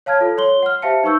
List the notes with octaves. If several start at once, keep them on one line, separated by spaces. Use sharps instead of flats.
C#5 F5 A5 F6 G#6
F4 A4
C#5 C6 G7
F#5 F6
G4 C5 E5 F5 A5 C#7
D#4 B4 C#6 E6 G6